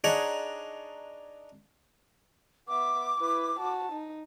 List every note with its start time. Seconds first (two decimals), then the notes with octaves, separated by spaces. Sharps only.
0.04 D4 D#4 G#4 C#5 F#5 A#5
2.69 B3 E5 D6
3.19 E4 B4
3.60 F#4 A5
3.92 D#4